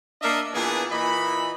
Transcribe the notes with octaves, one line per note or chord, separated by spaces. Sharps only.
A#3 D4 A#4 D#5 E5
A#2 E3 B3 D4 G#4
A#2 E3 D#5 B5